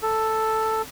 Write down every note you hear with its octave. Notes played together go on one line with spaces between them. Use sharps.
A4